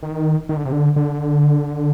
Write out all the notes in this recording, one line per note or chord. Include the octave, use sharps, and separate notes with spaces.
D#3
D#3
D3
C3
D3
D3